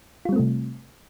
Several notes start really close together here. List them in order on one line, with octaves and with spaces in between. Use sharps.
F4 G3 C4 A3 C3